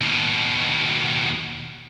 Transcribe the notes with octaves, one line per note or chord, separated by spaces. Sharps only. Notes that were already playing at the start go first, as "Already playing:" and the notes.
D#2 B2